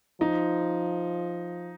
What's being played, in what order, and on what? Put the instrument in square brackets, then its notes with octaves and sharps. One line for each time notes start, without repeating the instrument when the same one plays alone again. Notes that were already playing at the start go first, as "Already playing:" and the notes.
[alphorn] F3 [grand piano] D#4